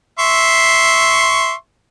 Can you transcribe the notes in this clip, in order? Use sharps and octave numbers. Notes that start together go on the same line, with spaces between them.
E5 C6 C#6